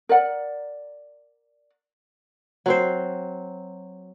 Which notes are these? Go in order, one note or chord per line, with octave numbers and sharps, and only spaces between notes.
A#4 D5 F#5
F#3 C4 C5